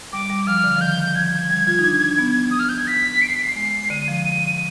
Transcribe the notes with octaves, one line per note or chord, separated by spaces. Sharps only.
G3 D6
G3
F3 F6
D3
F3
D#3 G6
F3 G#6
G3
F4
D#4
D4
D4
B3
D#6
F6
G6
G#6
B6
D7
C7
B6
C7
G#3 C7
D3 D#7
F3
D#7